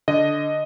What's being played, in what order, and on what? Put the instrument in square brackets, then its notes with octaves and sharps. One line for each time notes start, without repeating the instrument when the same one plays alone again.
[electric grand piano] D3 D#5